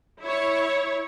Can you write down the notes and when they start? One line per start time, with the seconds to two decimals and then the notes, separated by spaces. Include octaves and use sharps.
0.22 E4 C#5